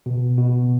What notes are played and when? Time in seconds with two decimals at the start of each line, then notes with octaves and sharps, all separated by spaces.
0.06 B2
0.38 B2